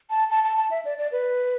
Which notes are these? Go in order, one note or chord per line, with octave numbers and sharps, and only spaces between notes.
A5
A5
A5
A5
E5
D5
D5
B4